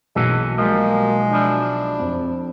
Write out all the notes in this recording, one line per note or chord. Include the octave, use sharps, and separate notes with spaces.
B1 E3 G#3 A#3 C#4
F3 G3 G#3 A#3
F3 D4 E4
F2